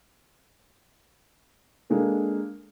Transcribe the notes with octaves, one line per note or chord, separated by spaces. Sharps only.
G#3 A#3 D4 A4